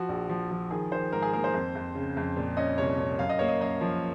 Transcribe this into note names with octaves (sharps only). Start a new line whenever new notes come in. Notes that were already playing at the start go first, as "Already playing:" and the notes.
Already playing: F3 F#4
A#1
F3
F3
D#3 G#4
D#3 C5
G#2 A#4
G#4
A#3 A#4
C5
F2
F2
C#3
F2
A#2
C#4 D#5
C2 C#5
C#4
F#2 F5
D#5
A#3 C#5
D#5
F#2 D#5
F3